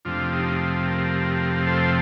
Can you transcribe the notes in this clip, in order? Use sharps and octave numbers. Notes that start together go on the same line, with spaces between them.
F2 C3 F3 A3 C4 D4 F4
D#4 G4
G4 A#4
A4 C5